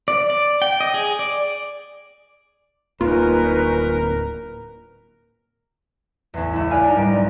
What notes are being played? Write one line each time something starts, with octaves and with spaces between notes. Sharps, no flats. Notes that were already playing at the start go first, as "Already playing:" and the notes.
D5
D5
G5
D#5
G#4
D5
D1 A#3 C#4 D#4 F4 A#4 B4
A1 E2
C#2 E4
B4 D5 F5 G#5
D4 D#4
G#2 G3 A#4 D7
B1